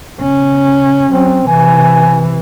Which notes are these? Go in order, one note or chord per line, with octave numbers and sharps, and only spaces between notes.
C#3 C#4
F#3 C4 C#4
C3 E3 G#5